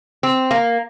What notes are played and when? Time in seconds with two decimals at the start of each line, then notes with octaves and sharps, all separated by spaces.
0.23 C4
0.51 A#3